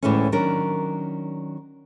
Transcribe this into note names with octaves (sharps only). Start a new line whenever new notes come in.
D2 A2 E3 G#3 A3 C#4
D#3 F#3 C#4 D4 A#4